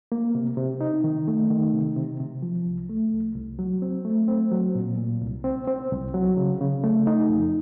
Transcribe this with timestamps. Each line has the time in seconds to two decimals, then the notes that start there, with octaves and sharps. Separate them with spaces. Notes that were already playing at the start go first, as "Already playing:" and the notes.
0.12 A#3
0.35 C3
0.57 C3
0.81 D#4
1.04 D#3
1.28 A3
1.50 D#3
1.73 C3
1.96 C3
2.20 C3
2.42 F3
2.66 C2
2.90 A3
3.13 C2
3.35 C2
3.59 F#3
3.82 C4
4.05 A3
4.28 C4
4.52 F#3
4.75 A#2
4.98 A#2
5.21 C2
5.44 C4
5.67 C4
5.91 C2
6.14 F#3
6.37 C#3
6.61 C#3
6.84 A3
7.07 D#4
7.29 F2